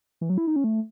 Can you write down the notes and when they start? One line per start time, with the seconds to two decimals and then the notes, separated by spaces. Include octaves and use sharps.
0.21 E3
0.30 F#3
0.38 E4
0.47 D#4
0.56 C#4
0.64 A3